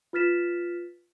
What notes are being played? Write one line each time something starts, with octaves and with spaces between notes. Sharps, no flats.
F4 B4 F6 A6 B6 E7